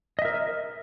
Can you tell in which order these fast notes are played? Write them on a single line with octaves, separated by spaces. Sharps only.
D#5 E5 A#4